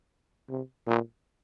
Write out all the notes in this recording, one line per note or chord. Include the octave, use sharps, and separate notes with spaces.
C3
A#2